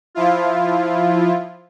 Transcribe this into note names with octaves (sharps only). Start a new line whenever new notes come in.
F3 E4 F4